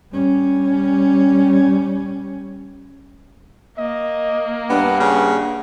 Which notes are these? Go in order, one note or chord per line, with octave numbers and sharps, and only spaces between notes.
G3 C#4
A#3 D#5
G2 B3 F#5
C#3